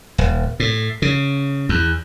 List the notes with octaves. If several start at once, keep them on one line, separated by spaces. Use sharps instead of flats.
D#1
A2
C#3
E2